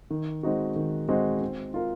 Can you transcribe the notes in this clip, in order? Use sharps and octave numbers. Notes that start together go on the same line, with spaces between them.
D#3
G#3 C4 D#4 F#4
D#3
G#3 C4 D#4 F#4
C4
F4 A#4